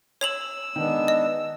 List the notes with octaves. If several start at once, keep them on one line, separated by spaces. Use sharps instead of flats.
C#5 E6 F7 F#7
D#3 G#3 B3 D4
D#5